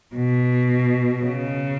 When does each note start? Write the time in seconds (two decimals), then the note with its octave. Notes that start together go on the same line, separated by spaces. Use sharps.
0.16 B2
1.23 C#3